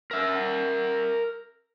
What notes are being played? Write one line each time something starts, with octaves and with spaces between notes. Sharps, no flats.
A#4 E5